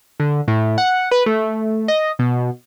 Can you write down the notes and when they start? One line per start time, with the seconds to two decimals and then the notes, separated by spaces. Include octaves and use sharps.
0.20 D3
0.48 A2
0.78 F#5
1.11 B4
1.26 A3
1.88 D#5
2.19 B2